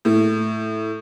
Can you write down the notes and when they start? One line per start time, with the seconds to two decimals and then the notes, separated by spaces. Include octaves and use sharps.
0.05 A2